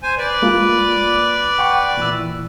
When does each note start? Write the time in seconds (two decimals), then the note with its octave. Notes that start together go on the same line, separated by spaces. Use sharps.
0.03 C5 G#5
0.18 B4 D5
0.42 G#3 A#3 F4
1.59 F#5 G5 C#6
1.97 A#2 E3 E6